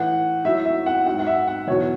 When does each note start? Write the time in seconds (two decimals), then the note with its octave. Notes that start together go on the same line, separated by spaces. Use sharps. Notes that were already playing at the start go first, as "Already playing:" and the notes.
Already playing: A2 E3 F#5
0.45 A2 F#3 E5
0.65 E5
0.86 F#5
1.06 G#2 F#3 F#5
1.19 F#5
1.27 E5
1.47 F#5
1.67 E2 B2 F#3 C#5